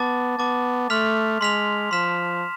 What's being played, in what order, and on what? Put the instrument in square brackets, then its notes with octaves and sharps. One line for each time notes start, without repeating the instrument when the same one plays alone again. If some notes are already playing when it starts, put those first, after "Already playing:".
Already playing: [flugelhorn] B3 [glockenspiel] A5 D6 A6
[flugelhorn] B3 [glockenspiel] A5 D6 A6
[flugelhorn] A3 [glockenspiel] C6 F6 B6 F7
[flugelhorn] G#3 [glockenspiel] C6 F6 B6 F7
[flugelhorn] F3 [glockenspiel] C6 F6 B6 E7